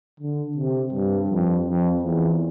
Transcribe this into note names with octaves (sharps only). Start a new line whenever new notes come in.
D3
C3
G2
F2
F2
E2